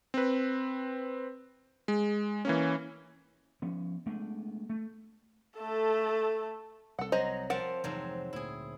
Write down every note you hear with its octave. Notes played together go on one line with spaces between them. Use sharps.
C4 B4
G#3
E3 A#3 C#4
F3 B3 C#4
G#3 A3 B3 D4
A3
A3 A4
C2 A4 F#5
F#3 C5 D#5 A#5
F3 C4 A#4 F#5 A5
F1 G#2 E3 F#3 C4
D2 A#2 E4 G#4